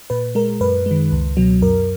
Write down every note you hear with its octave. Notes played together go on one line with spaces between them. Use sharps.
A#2 B4
G#3 A#4
F#2 B4
D#3 G#3
C#2
B2 F#3
F#2 A#4